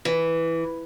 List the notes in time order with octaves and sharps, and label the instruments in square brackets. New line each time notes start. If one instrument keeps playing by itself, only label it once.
[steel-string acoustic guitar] E3